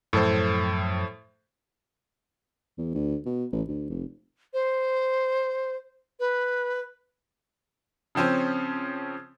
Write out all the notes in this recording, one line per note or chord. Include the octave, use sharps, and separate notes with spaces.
F#2 A2 F3 A4 C5
E2
D2
B2
A1
D2
F1
C5
B4
C#3 F3 C4 C#4 C5